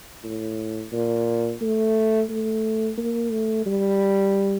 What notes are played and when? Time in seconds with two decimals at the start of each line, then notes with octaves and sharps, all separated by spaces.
0.24 A2
0.93 A#2
1.61 A3
2.30 A3
2.98 A#3
3.31 A3
3.66 G3